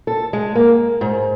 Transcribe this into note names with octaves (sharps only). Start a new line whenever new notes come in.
A4
G#3
A#3
G#2